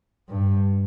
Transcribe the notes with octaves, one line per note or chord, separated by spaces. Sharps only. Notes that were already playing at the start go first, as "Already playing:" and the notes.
G2